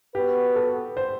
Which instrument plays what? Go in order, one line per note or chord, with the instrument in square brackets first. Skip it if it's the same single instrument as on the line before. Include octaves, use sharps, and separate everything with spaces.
[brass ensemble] B3 F#4 B4 [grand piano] G4
[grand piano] A4
C5